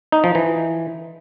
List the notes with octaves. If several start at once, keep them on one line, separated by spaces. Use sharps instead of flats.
D#4
F3
E3